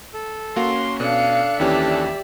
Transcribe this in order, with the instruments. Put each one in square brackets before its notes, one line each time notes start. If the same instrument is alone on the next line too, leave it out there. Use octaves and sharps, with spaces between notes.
[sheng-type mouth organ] A4
[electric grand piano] A#3 F#4 F5 [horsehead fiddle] C#4 [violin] C6
[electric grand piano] B2 [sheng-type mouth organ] D4 A4 F#6 [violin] F5 C#7
[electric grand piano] D#2 E3 C#4 [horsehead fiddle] G4 D5 [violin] E5